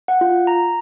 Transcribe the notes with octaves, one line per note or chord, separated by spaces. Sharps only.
F#5
F4
A#5